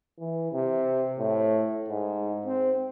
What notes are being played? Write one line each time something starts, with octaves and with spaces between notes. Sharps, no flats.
E3
C3
A2
G#2
C4